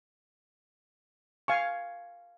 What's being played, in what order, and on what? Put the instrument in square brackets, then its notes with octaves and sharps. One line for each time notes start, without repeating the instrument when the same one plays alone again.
[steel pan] F5 G#5 C#6